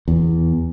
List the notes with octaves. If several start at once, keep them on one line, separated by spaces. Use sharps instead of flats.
E2